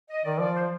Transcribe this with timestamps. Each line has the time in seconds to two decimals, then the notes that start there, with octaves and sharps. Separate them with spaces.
0.09 D#5
0.24 D#3 D5
0.40 F3 D5
0.55 C5